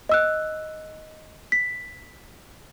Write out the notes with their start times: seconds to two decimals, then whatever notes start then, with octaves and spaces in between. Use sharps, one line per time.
0.09 D#5 E6 F#6
1.52 B6